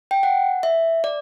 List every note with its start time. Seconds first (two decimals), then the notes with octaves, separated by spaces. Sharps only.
0.11 G5
0.23 F#5
0.63 E5
1.04 D5